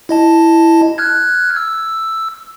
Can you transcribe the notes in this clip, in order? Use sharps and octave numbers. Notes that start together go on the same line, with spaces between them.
E4 D#5 A5
F6 F#6 G#6
E6